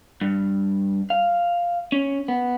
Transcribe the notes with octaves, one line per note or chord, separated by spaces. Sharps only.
G2
F5
C#4
B3